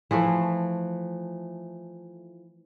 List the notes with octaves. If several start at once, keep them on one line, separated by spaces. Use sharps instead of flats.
E3 F3 A3